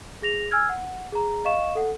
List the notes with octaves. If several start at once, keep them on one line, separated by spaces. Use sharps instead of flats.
G#4 A#6 F7
G#5 E6 F6 G#6
F#5
G#4 A#5
D#5 F5 C#6 E7
A4 F#5